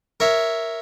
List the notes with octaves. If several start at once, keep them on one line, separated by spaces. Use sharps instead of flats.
A#4 C#5 E5